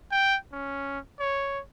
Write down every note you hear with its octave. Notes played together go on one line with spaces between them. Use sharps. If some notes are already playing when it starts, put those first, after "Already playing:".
G5
C#4
C#5